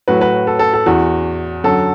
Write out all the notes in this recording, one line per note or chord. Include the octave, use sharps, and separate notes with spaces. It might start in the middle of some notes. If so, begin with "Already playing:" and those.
A2 F#3 F#4 B4
F#4 B4
A4
A4
A4
E2 E3 F#4
F#2 D3 F#3 A4